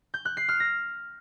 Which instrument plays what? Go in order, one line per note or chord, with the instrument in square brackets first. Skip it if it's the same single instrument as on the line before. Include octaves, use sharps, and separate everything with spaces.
[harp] G6
F#6
C7
F6
A#6